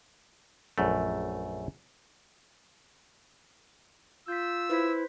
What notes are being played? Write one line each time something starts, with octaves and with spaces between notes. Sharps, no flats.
A#1 F#2 A3
F4 E6 G6 B6
E4 B4 C5 B6